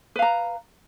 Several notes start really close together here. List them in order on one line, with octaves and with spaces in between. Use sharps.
B4 F5 A#5